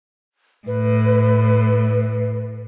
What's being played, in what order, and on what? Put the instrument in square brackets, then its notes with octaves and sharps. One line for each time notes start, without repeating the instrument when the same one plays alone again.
[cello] A2 [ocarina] B4